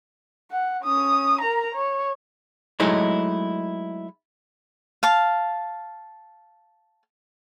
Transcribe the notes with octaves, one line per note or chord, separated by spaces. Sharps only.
F#5
C#4 D#6
A#4 A#5
C#5
F#3 G#3 A3 D#4 E4
F5 A5